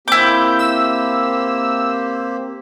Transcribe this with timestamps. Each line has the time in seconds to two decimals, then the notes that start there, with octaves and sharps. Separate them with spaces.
0.08 A#3 C4 E4 G4 D6 G6
0.59 E6